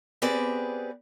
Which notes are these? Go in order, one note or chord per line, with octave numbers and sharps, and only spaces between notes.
B3 C4 G4 G#4 B4 D5